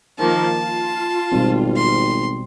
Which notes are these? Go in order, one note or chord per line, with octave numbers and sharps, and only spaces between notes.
D#3 F3 A#3 A5
F4
G#1 B2 G3 C4
C6